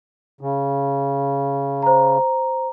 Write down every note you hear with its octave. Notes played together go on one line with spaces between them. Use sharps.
C#3
C5 A#5